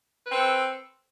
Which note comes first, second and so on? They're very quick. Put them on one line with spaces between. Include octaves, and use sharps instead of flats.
B4 C4 A4